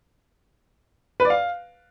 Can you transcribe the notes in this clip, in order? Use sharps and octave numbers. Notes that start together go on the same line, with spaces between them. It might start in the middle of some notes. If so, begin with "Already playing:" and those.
B4
D5
F5